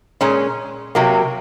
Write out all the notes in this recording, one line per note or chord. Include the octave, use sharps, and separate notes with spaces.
A#2 G#3 C#4
C3 F#3 A#3